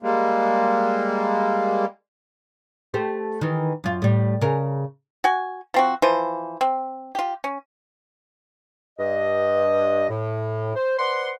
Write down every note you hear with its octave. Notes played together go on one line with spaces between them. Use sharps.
G3 G#3 A#3
A3 G4 C5
D#3 E3
F#2 F4
A2 G3
C#3 A#4
F#4 G#5
F3 C4 F#4
E3 F3 C5
C4
F4 G4
C#4
G2 D#5
A2
C5
B4 C5 D5 F#5 C6